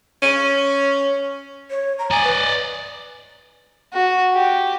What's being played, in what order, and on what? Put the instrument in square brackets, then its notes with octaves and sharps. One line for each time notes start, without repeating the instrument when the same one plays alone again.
[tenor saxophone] C#4
[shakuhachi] C#5
A#5
[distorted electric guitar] D5 D#5 [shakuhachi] G#5
[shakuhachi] B4
[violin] F#4
G4